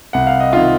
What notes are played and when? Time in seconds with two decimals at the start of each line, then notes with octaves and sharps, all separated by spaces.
0.13 C2 F#5
0.27 F5
0.40 D#5
0.53 C3 D#3 F4 F5